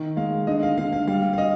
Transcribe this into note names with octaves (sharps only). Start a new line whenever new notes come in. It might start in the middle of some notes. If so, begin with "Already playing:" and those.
Already playing: D#3
G#3 F5
D3 D#5
F5
D3 F5
F5
G3 F5
F5
D#5